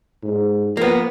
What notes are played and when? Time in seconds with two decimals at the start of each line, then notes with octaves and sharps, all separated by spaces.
0.23 G#2
0.77 F3 A#3 B3